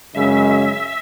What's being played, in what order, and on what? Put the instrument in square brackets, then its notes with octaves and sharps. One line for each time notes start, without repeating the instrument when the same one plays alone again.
[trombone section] F#2 C#3 G#3 [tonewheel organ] E5